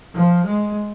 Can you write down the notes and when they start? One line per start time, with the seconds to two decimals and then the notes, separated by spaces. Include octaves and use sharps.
0.14 F3
0.46 G#3